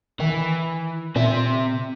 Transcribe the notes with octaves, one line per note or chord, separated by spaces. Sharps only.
D#3 E3
A#2 C4 E5